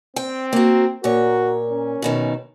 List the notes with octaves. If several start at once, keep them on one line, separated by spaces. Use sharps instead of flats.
C4 G5
A#3 F#4
A#2 F#4 A#4 C#5
C#4
F#2 B2 D#3